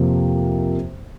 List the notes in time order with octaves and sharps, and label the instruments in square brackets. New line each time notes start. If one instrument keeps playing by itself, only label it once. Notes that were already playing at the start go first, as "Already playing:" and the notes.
Already playing: [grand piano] F2 C3 F3 A#3